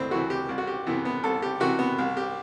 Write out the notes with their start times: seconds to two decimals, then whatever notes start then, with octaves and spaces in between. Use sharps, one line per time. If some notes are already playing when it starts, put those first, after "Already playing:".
Already playing: D2 C4 E4
0.11 C3 E3 F#4
0.30 G4
0.49 C2
0.58 F#4
0.67 G4
0.86 C3 E3 B3
1.05 B3
1.23 C2 A4
1.42 G4
1.60 C3 E3 F#4
1.79 B3
1.98 C2
2.17 G4